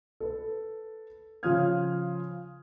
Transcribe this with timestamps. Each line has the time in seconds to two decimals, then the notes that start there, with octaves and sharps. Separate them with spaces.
0.20 A4 B4
1.43 C#3 F3 F4 D#6 F6 G#6